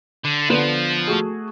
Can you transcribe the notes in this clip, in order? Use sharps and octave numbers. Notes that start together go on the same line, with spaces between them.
D3
D3 F3 B3
A3 F#4 G#4